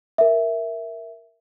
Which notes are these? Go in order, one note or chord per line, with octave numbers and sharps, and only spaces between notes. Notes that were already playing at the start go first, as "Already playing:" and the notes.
A#4 E5